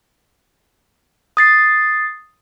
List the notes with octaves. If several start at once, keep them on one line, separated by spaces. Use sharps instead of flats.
D#6 A6 C7